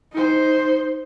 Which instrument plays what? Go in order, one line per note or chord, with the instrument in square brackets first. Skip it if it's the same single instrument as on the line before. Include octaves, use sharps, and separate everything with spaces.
[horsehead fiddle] D#4 C5